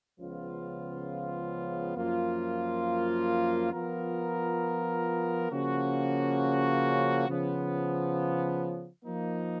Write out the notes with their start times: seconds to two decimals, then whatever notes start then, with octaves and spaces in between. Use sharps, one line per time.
0.18 C#2 C#3 F3 B3 F4
1.96 F#2 F3 A#3 F4
3.72 F3 B3 F4 A#4
5.50 C#3 F3 A#3 C#4 F#4
7.27 C#3 F3 B3
9.05 F3 A#3 D#4